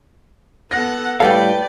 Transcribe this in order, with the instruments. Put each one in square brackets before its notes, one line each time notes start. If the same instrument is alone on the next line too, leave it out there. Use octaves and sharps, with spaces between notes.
[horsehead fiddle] B3 A4 [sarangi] F#5 [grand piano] A#6
[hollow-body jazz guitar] A2 G3 F5 [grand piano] A4 [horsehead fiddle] B4 G5 [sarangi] D5